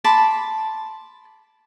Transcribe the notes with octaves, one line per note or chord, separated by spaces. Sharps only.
A5 B5 C6 D6